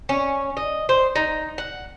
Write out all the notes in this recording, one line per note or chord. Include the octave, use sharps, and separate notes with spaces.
C#4
D#5
C5
D#4
F#5